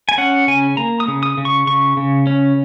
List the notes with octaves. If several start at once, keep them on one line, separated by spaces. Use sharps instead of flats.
G#5
C#4 F#5
C#3 G#5
A#3 A#5
D#6
C#3
D#6
C#3
C#6
C#3 C#6
C#3
C#4